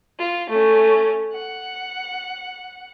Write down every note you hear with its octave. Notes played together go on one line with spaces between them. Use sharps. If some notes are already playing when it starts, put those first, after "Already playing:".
F4
A3 C#4
F#5